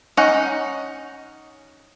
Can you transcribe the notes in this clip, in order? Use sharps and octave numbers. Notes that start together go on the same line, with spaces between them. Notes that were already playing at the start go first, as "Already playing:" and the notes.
C#4 D#4 F#5